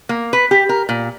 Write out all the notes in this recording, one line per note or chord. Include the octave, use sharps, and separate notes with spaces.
A#3
B4
G4
A#4
A#2